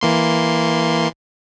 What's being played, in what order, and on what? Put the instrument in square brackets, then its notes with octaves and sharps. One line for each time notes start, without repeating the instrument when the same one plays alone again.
[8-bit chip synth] E3 A#3 C6